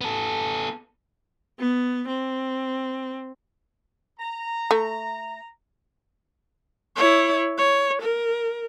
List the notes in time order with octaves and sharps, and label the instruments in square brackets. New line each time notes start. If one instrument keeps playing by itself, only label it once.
[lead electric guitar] B3 A4
[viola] B3
C4
[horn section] A#5
[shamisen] A3
[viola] E4 C#5
C#5
A#4